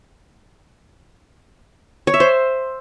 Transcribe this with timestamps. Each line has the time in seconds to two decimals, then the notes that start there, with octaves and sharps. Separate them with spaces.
2.07 C#5
2.14 E5
2.20 C5